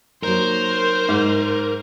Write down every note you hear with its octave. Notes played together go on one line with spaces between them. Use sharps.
F#3 A#3 D#4 A#4 C5
G#2